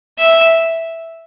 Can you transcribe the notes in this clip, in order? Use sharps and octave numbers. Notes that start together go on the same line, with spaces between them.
E5